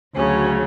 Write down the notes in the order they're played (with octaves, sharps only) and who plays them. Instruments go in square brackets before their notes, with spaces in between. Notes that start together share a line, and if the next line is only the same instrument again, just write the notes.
[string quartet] D2 C#3 F#3 C#4